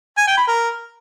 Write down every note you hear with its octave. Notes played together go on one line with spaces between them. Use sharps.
G#5
G5
B5
A#4